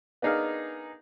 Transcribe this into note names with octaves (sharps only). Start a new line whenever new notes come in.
B3 D4 D#4 G#4 A#4 F5